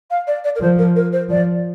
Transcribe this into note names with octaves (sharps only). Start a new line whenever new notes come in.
F5
D5
D5
A#4
F3 C5
A#4
A#4
C5
F3 D5